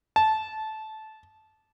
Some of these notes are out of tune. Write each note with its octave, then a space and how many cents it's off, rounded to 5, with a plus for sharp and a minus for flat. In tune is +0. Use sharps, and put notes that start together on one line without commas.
A5 -15